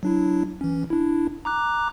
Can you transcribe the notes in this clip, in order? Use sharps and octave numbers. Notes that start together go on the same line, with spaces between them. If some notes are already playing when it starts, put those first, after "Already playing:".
F#3 D4 E4
E3 C#4
D4 E4
A#5 D6 F#6